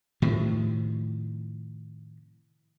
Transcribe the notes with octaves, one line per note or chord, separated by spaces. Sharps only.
A2 C3 D#3 F3